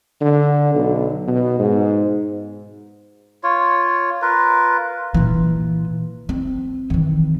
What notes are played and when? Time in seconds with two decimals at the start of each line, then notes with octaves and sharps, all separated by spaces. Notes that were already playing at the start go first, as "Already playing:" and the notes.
0.21 D3
0.75 B1
1.27 B2
1.59 G#2
3.43 F4 C#5
4.22 F4 A#4 B4
5.14 A#2 E3
6.29 C4
6.90 D#3 E3